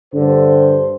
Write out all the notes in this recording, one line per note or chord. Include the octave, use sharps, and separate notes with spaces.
G2 D3 C5